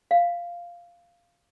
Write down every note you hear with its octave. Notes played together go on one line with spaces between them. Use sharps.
F5